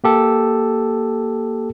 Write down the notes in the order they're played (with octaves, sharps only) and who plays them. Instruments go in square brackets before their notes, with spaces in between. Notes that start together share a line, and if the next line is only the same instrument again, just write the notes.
[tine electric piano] A#3 G4 A4